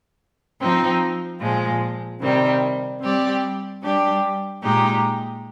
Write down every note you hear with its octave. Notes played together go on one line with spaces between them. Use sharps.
F3 C4 D#4
A#2 F3 G#3
C3 D#3 G3 C4
G3 C4 G4 D5
G3 D4 G4
A#2 G#3 D#4 G4